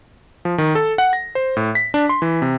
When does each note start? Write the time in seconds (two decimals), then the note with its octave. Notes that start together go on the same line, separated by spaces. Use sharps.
0.45 F3
0.58 D#3
0.75 A4
0.98 F#5
1.13 A#6
1.35 C5
1.57 A2
1.75 B6
1.94 D4
2.09 C6
2.22 E3
2.42 C3